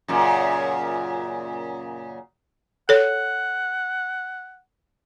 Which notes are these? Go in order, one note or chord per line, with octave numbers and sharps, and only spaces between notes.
F#2 A#2 C#3
A4 C#5 F#5